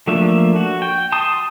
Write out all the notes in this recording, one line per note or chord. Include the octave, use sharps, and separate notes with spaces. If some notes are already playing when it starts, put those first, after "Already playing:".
F3 A3 A#3 D4 E5
F#4
G5
A5 C6 D#6